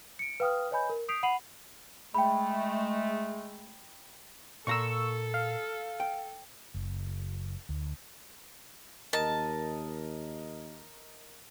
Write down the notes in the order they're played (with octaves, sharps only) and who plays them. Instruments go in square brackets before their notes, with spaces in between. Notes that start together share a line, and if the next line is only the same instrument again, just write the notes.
[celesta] C#7 D7
B4 F5 G5 D#6 F6
B4 C#5 D#5 G#5 B5 G6
A#4
D#6 G6 B6 C7 D7 F7
F#5 B5 C7 D#7 F7 F#7
[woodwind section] G#3 A3 [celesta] G5 B5
[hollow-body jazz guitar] A#2 A#3 A#5 [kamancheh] A4 [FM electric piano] C#6 E6
[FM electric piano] F5
[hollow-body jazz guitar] G5
[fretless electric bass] F#1
D2
[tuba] D#2 [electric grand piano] A#4 D#5 [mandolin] A5